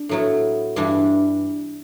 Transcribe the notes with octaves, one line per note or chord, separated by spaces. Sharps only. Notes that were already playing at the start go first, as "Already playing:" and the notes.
Already playing: D4
A2 F#3 B3 E4
G2 E3 G3 D4